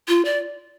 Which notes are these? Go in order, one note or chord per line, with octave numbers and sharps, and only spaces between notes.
F4
D5